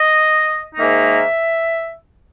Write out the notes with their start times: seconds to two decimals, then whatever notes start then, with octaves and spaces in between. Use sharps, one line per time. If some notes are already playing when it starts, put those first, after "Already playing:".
Already playing: D#5
0.75 G#2 D#3 A#3 D#4 E5